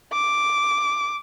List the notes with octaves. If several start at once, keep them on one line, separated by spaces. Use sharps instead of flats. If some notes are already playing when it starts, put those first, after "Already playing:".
D6